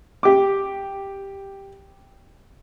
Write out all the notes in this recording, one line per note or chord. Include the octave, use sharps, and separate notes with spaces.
G4 D6